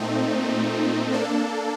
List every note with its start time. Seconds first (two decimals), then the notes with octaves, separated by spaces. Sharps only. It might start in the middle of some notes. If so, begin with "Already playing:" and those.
Already playing: A#2 A3 C4 D#4
1.12 A#3 D4 A4